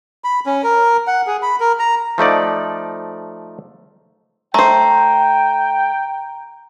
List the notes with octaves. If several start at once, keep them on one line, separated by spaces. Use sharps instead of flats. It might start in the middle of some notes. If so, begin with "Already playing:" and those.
B5
C#4
A#4
F#5
G#4
B5
A#4
A#5
F3 A3 D#4 D5
A3 C5 G5 A#5